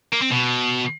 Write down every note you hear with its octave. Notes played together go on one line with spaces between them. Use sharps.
A#3
C4
B2